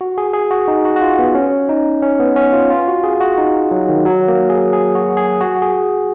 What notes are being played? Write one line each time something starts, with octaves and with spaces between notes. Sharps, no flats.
F#4
G#4
G#4
F#4
D#4
F#4
F#4
F4
B3
C#4
D#4
C#4
B3
C#4
F4
F4
F#4
G#4
F#4
D#4
F#3
D#3
F#3
A#3
G#4
G#4
F#4
G#4
F#4
G#4